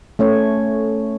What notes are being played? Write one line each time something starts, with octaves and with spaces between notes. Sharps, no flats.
A3 C#4 C#5